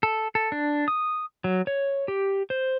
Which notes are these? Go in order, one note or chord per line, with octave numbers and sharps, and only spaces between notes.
A4
A4
D4
D#6
F#3
C#5
G4
C5